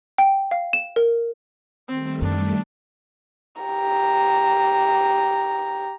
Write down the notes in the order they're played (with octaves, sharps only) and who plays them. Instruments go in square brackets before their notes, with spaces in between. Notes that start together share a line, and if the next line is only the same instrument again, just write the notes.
[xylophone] G5
F5
E7
A#4
[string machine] D#3 G3 A3 [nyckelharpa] C4
[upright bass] F#2 [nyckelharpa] D4
[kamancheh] G4 A#5